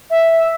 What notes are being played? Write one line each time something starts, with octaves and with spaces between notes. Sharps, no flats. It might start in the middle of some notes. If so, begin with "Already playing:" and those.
E5